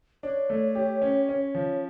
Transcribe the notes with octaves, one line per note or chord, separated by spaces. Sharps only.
D4 C#5
A3
G4
C#4
C#4
F3